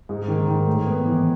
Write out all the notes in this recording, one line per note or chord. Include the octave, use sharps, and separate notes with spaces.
G#2
D#3
D#3
A2
B3
E3